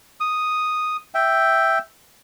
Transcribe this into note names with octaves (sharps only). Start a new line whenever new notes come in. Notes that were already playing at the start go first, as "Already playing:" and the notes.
D#6
E5 G5